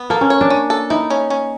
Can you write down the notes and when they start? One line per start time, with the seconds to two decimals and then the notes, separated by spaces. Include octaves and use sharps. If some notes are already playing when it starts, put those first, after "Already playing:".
Already playing: B3
0.10 A#3 A4
0.21 C#4
0.30 C#5
0.41 D4
0.50 C#4
0.70 A4
0.90 D#4 E4
1.10 C#4
1.30 C#4